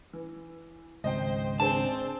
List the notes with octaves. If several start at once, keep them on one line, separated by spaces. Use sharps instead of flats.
E3
G#1 C#2 C5 D#5 G5
C4 D4 G#4 C5 A5